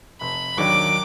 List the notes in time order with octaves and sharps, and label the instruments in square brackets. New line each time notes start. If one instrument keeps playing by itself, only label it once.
[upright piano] F1 [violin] B5
[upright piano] D#2 D#3 F#3 D4 [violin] D6